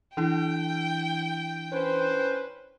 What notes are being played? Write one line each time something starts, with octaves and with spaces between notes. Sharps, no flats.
E3 D4 E4 G5
C#4 B4 C5